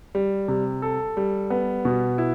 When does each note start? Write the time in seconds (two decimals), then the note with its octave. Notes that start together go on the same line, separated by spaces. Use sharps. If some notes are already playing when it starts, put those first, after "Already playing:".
0.15 G3
0.48 C3
0.82 A4
1.17 G3
1.50 B3
1.85 B2
2.18 E4